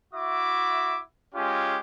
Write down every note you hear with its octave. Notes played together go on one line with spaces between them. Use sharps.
E4 F#4 E5 D6
G#3 C#4 F4 G4